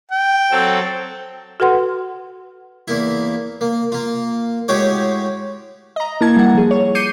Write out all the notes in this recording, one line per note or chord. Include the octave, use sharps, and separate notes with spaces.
G5
F#3 C4 A4
F#4 A4 B4 F#5 C6
E2 A#3 E4
A#3
A#3 F4
A2 G#3 F#4 G4 C#5 D6
D#5 A#5
A#3 E4 A5 G#6
G3 F#5
F3 G#4
C#5
D6 G6 C7 C#7 D#7